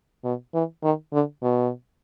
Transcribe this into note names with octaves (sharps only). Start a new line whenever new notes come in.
B2
E3
D#3
D3
B2